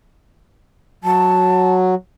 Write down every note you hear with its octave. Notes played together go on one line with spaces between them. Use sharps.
F#3 A5